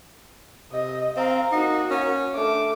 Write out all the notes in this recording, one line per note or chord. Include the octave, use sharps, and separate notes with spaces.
C3 D#5
C4 F5 A#5
A#3 D#4 F#4
C#4
A3 D4 D6